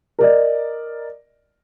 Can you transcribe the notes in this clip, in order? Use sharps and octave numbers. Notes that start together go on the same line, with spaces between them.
A#4 D5 D#5